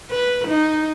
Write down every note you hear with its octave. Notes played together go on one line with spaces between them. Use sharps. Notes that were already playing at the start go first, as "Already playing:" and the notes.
B4
D#4